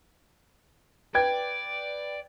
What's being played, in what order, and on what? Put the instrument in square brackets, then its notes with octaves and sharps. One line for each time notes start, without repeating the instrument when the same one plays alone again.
[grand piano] B4 G5 G#6 [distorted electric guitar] D5